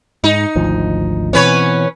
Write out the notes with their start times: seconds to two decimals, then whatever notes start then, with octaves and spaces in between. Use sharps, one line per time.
0.24 G#2 D#4
0.56 G#1 D2 F3
1.33 B2 E3 C4 C#4 B4 C#5